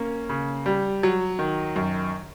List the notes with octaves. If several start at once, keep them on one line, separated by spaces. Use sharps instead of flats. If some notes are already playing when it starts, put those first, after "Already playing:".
Already playing: A#3 C#4
C#3
G3
F#3
D#3
F#2